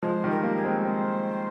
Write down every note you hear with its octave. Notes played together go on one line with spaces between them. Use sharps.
F3 G#3 C5
D#3 G3
A#4
G3 A#3
G#4
G#3 C4
G#3 C4 C5